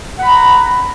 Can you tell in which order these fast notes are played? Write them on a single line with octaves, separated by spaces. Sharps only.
F#5 B5 A#5